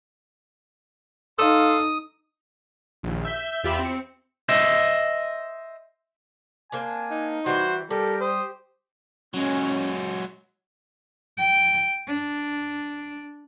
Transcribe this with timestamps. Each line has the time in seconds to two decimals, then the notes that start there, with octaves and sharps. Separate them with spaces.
1.38 D#4 A4 F5 C6 D#6
3.03 A#1 D#2
3.25 E5 G6
3.64 E2 F4 G4 E5 B5 E7
3.79 C4 C#7
4.49 C5 D#5 E5
6.72 A#3 C4 D4 G#5
7.11 D#4
7.46 E3 G3 F#4 C5
7.91 G3 G4 A4 A#4
8.20 C5 D#6
9.34 F#3 G#3 C#4
11.38 G5
12.08 D4